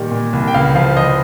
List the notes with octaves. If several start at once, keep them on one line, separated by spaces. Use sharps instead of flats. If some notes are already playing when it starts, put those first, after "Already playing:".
Already playing: A#2 D#3 G3
A#2
C2
G5
C#2 F5
F3 F5
F3 D#5